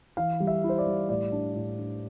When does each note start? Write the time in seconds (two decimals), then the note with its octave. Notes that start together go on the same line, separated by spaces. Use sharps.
0.17 E3 F5
0.40 G3
0.47 E5
0.64 E4
0.69 C5
0.78 D5
0.86 G3
1.09 A2 D5
1.32 D4
1.55 A2
1.78 D4